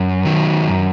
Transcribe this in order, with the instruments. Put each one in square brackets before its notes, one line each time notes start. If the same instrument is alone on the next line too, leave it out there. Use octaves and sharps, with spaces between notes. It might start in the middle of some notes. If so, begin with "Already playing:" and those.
Already playing: [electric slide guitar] F#2
D#3 F#3
F#2